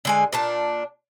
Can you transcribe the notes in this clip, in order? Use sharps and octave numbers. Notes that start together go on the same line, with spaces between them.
D3 G#3 G#5
A#2 D4 A5